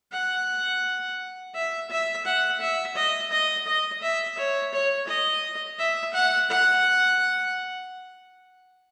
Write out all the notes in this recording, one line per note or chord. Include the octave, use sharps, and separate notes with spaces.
F#5
E5
E5
F#5
E5
D#5
D#5
D#5
E5
C#5
C#5
D#5
E5
F#5
F#5